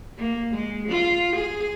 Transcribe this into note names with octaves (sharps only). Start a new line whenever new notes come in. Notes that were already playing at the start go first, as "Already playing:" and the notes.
A#3
G#3
F4
G#4